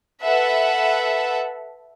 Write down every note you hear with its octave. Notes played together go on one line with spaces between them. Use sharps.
A4 B4 E5 F#5